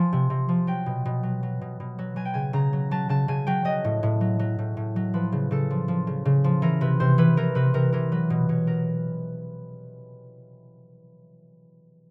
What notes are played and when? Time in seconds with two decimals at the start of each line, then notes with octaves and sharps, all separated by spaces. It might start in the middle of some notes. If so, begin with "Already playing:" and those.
Already playing: F3 G#5
0.13 C3
0.30 C3
0.49 F3
0.67 F#3 G5
0.86 B2
1.05 B2
1.23 F#3
1.43 F#3
1.61 B2
1.80 B2
1.99 F#3
2.16 F#3 G#5
2.25 G5
2.34 C#3 G#5
2.53 C#3 A#5
2.73 F#3
2.91 F#3 A5
3.09 C#3 A5
3.28 C#3 G#5
3.47 F#3 G5
3.65 F#3 D#5
3.84 A2
4.03 A2
4.21 F#3
4.39 F#3
4.59 A2
4.77 A2
4.96 F#3
5.14 F3 B4
5.32 C#3
5.51 C#3 A4
5.70 F3
5.88 F3
6.07 C#3
6.25 C#3
6.44 F3
6.62 E3 A#4
6.81 C3 B4
7.00 C3 C5
7.18 E3 B4
7.37 E3 A#4
7.55 C3 B4
7.74 C3 A#4
7.92 E3 A#4
8.12 F#3 B4
8.30 B2
8.49 B2 C#5
8.67 F#3 A#4